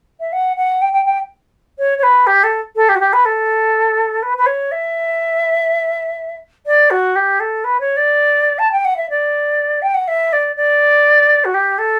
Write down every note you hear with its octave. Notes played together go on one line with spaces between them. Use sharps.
E5
F#5
F#5
G5
G5
G5
C#5
C#5
B4
G4
A4
A4
G4
F#4
G4
B4
A4
B4
B4
C#5
E5
D5
F#4
G4
A4
B4
C#5
D5
A5
G5
F#5
E5
D5
G5
F#5
E5
D5
D5
F#4
G4
A4